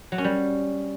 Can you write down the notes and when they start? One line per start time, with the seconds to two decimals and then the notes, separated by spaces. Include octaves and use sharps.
0.12 F#3
0.18 C#4
0.24 G3